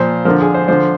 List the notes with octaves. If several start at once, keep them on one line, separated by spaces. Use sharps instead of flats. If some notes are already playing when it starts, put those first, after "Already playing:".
Already playing: A#2 F3 C5
D3 F3 A#4
G#4
C5
D3 F3 C5